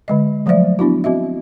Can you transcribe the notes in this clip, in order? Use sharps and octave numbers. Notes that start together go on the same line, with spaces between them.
D3 G#3 D#5
F3 F#3 A3 C5 D5 E5
B3 D4 E4 F#4
C4 F#4 D#5 E5